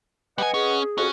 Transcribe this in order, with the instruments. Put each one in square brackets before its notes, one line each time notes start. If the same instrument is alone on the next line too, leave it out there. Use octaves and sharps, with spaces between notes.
[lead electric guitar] G3 G#5 [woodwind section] B4 D#5 F#5
[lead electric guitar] C#4 [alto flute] G#4
[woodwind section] F2 F#4 [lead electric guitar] C#4